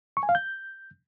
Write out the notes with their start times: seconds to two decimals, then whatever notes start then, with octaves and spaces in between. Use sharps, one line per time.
0.17 C#6
0.23 G#5
0.29 F5
0.35 G6